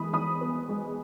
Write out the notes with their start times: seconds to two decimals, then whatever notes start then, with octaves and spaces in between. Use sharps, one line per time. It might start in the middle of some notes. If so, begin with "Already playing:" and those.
Already playing: E3 G#3 B5 D#6
0.13 E3 B5 D#6
0.41 B3
0.69 G#3